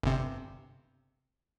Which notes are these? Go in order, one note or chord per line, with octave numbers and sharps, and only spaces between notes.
G1 C3